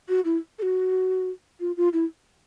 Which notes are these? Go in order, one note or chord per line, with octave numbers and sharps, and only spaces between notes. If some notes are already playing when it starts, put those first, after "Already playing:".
F#4
E4
A4
F#4
F4
F4
E4